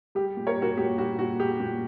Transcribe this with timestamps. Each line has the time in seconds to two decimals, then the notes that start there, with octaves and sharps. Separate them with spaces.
0.15 G3 G4
0.37 A#2
0.47 A#4 C#5
0.57 G3
0.62 F#4 A#4
0.77 A#2 G4
0.98 G3 F#4
1.19 A#2 F#4
1.39 G3 G4
1.60 A#2